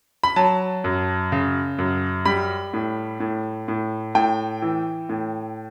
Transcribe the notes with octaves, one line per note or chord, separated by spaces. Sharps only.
B5
F#3 A5
F#2
C#3
F#2
G3 B5
A2
A2
A2
A2 G5
E3
A2